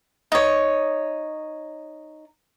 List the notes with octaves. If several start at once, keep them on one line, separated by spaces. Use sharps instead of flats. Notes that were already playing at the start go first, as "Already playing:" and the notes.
D#4 C#5